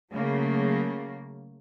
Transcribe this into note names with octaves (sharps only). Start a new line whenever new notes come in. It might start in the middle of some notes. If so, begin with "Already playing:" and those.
C#3 F#3 A3 A#3